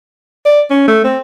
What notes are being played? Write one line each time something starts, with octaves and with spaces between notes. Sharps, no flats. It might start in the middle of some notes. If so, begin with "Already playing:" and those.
D5
C#4
A3
C4